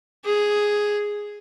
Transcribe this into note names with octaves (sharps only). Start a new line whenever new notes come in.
G#4